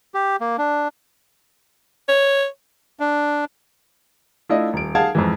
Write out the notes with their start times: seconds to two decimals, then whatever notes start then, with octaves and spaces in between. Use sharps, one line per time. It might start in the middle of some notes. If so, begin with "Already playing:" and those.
0.14 G4
0.41 A#3
0.58 D4
2.08 C#5
3.00 D4
4.49 A3 D4 E4 F4 D#5
4.73 D#1 D7
4.95 G#4 F5 F#5 A5 G#6
5.15 F2 G#2 E3